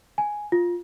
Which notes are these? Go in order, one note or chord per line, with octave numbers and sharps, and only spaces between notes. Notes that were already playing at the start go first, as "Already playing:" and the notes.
G#5
F4